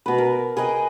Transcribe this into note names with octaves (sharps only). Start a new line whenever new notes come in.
B2 B4
A#4
G#4 B4 D#5 G5